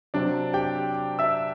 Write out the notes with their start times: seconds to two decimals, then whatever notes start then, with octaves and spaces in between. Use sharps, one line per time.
0.14 C3 F#3 C4 D4 D5
0.54 G4 G5
1.19 E5 E6